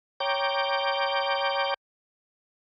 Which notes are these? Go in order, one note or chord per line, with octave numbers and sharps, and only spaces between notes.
C#5 G5 A#5 D6 G6